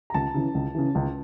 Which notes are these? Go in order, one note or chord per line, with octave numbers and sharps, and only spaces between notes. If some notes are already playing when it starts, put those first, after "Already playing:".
A#5
C#2 A5
C#3 E3
C#2
C#3 E3
C#2